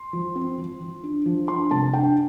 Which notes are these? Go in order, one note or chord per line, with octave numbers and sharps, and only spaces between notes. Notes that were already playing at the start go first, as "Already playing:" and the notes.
Already playing: C6
F3
C4
F3
F3
D4
F3
D4 C6
C3 A5
D4 G5